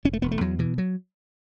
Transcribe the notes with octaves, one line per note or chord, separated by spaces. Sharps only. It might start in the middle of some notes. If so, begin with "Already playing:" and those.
E1 C#4
A3
E1 B3
A3
E2 F#3
B2 E3
F#3